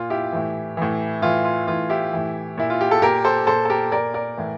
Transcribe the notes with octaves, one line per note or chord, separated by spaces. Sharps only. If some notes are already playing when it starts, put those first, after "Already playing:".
Already playing: A#2 F4
E4 G4
A2 E3
A2 E3
A2 E3 F4
F4
A2 E3 F4
E4 G4
A2 E3
A#2 E4
F4
G4
A4
A#2 G4 A#4
A4 C5
A#2 A4 C5
A4
G4 A#4
A#2 A#4 D5
A#4 D5
A2 E3